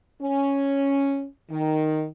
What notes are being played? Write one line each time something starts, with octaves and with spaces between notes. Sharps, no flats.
C#4
D#3